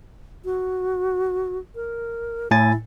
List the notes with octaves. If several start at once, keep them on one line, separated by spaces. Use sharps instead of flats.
F#4
A#4
A2 E4 G#5 A6